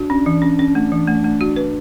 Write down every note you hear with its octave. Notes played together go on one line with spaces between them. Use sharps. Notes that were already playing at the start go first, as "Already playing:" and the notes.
Already playing: D4 F#4
C#4
E3
C#4
C#4
A3
E3
A3
A3
F#4
B4